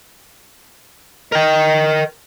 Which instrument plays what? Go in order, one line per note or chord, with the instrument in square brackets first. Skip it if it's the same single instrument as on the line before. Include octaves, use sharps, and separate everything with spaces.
[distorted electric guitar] A#4 G5 [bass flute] D#5